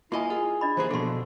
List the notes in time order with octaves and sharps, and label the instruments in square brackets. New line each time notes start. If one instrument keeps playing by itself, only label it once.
[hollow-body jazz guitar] A#3 D#5 [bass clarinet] E4 [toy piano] F4 G#5
[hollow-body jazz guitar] F4 [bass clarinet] G#4 [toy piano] F#5
[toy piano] D4 D#5 B5
[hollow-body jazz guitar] E3 A#3 G#4 [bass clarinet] C5
[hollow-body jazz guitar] B2 D3 [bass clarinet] F3 [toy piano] A4 C6